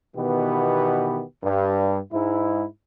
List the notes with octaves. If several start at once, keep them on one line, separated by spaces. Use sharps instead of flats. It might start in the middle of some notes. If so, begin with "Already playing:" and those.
B2 D#3 E3 B3 G4
G2
G#2 E4